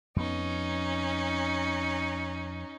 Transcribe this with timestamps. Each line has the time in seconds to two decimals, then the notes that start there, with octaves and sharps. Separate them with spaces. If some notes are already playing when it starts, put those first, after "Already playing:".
0.16 F2 B3 C#4 D#4